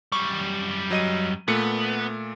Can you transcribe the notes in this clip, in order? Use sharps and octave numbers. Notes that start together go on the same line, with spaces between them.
F#2 G3 C#6
F#3 D#5 D#7
A#2 A3 B3 C#7